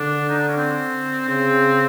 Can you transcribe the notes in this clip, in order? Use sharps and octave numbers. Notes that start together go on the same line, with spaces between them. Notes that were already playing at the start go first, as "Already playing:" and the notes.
Already playing: D3 D4
D#4
D4
C#4
C4
C#3 C4